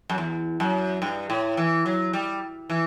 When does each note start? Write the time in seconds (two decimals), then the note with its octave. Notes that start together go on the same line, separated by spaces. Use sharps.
0.10 F#2
0.18 E2
0.60 F#2
1.02 G2
1.30 A2
1.57 E3
1.86 F#3
2.13 G3
2.70 E3